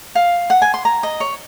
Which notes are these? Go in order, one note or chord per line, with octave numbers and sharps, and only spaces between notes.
F5
F#5
G#5
C6
A#5
D#5
C#5